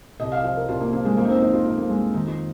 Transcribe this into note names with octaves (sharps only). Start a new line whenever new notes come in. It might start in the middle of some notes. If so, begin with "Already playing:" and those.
C2 D#5
F5
F3 F5
A#4
C2 F4
A#3
F3 A#3
G#3
F2 A#3
D#4
C4
F3 D#4
F4
F2 D#4
A#3
F2 G#3
D#3 D#4
F4